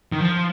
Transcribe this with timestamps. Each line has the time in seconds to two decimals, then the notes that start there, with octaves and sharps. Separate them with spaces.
0.12 D#3
0.20 F3